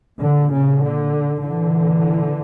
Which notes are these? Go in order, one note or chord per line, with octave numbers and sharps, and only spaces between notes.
A#2 D3
C#3
D3
A#2 D3 E3